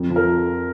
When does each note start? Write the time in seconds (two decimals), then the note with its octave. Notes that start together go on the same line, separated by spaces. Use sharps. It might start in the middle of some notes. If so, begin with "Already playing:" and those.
Already playing: F2
0.10 F3
0.16 A#4